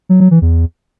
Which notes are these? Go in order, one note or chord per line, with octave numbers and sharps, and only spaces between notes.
F#3
F#3
E3
E2